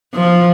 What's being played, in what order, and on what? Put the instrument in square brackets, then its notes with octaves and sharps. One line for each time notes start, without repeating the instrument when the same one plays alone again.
[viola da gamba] F3